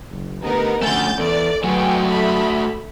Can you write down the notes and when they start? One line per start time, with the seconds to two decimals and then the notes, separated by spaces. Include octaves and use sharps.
0.10 F#1
0.43 D3 A3 B3 D#4 G4 A#4
0.83 G1 D3 F3 A3 C#4 F#5 G6 A6
1.19 E2 A4 D5
1.64 F#3 A3 F#4 G#4 B4 G5
2.08 A4 E5 B5